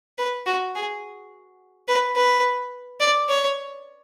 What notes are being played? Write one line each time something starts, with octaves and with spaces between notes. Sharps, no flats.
B4
F#4
G#4
B4
B4
D5
C#5